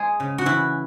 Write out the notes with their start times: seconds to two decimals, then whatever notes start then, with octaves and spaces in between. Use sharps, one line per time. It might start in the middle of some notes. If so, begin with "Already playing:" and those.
Already playing: G#3 G#4
0.20 C#3
0.38 F#4
0.45 E3 E4